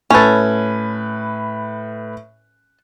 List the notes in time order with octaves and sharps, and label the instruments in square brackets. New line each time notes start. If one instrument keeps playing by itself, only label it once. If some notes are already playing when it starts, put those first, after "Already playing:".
[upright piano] A2 B4 [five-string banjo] C#4 A4